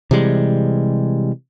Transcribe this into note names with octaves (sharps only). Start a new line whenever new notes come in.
C3 E3 G3 G#3